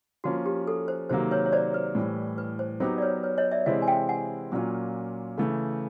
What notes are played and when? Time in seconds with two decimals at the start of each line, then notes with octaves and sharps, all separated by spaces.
0.24 F3 A#3 C#4 F#4
0.46 G4
0.67 A4
0.88 C5
1.10 C3 D#3 F#3 A#3 C5
1.31 B4 C#5
1.46 C#5
1.52 C5 D5
1.74 B4
1.95 A2 E3 G3
2.38 B4
2.59 C5
2.80 F#3 B3 D#4 G4 C5
2.98 D5
3.02 B4 C#5
3.23 B4 C#5
3.38 C#5 D#5
3.51 D5 E5
3.66 C3 E3 G#3 C4 E4 D#5 F5
3.82 G#5
3.88 F5 G5
4.09 F#5 G#5
4.52 A#2 F#3 A#3 C#4 F4
5.37 C#3 E3 A3